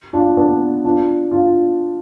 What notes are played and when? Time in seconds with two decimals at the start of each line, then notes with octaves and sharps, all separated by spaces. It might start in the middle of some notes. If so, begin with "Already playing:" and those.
0.13 D4 F4
0.37 B3 D4
0.84 D4 F4
1.31 D4 F4